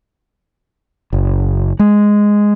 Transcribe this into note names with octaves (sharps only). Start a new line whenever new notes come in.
F#1
G#3